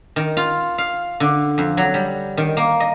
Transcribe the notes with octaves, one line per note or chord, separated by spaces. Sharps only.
D#3
F4
F5
D3
F2
F#3
G3
D#3
A#3
D#5